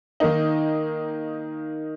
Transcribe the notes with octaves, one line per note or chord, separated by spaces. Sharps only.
D#3 A#3 D#4